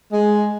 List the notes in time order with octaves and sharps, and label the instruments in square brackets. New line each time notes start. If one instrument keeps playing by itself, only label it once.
[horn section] G#3